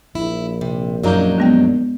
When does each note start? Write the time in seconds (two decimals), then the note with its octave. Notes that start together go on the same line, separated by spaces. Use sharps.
0.15 A#1 E4
0.61 C3
1.03 F#2 F#3 A#3 D4 D#4 G6
1.38 G#3 B3 G5